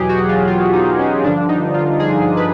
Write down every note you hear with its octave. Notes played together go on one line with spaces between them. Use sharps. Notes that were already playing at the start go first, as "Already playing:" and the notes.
Already playing: E2 B2 F#3 G4 G#4
F#4
F4
F4
D#4
C#4
G2 D3 F3 D4
D#4
F4
G#4
B4